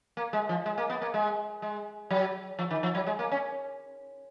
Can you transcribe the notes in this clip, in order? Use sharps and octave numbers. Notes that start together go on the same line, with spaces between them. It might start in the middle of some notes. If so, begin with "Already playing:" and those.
A#3
G#3
F3
G#3
A#3
B3
A#3
G#3
G#3
F#3
F3
D#3
F3
F#3
G#3
A#3
C#4